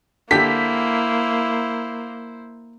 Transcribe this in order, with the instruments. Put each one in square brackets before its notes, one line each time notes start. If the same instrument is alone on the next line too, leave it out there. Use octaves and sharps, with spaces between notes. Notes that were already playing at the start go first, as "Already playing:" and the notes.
[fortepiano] D3 G4 [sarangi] A#3 [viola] E4 C5 [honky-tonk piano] B6